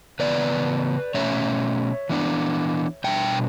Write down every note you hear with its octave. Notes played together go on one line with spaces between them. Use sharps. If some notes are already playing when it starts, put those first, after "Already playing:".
C#3 E3 B3 B4 D5
B2 A3 C#4 C#5 E5
E3 B3 D4
B2 G3 D4 E5 G5